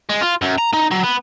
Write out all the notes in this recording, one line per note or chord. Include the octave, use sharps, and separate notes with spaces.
G#3
F4
F#2
A#5
D#4
F#3
B3